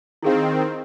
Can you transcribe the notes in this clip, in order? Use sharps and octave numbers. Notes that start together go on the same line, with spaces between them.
D#3 C4 E4 G#4 F5